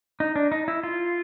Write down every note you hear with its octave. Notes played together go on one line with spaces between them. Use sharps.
D#4
D4
D#4
E4
F4